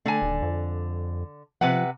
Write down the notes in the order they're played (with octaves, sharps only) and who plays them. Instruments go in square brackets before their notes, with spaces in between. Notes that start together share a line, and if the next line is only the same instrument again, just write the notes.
[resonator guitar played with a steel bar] D3 G#5 [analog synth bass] A3
[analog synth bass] D#1
F2
[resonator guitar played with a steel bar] C3 B4 F#5 [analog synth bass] F3